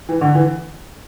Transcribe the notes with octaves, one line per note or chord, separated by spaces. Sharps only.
E3
D3
E3